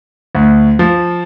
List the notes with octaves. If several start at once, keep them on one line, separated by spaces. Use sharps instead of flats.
D2
F3